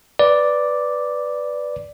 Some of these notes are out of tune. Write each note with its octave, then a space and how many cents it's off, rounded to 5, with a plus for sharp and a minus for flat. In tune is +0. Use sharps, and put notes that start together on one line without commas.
B4 +0 D5 +0